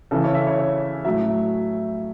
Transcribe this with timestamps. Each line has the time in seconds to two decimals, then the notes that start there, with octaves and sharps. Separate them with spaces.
0.11 C#3 E3 A4
0.24 C#5
0.34 E5
0.47 C#5
0.59 C#5
1.05 A2 F#3 E5